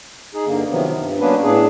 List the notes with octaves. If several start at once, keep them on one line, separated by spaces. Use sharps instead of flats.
D#4 G#4
G2 D3 A#3
C3 D#3 F3 F#3 B3
G2
F#3 A#3 B3 C#4 D4 B4
A2 B3 D4 G#4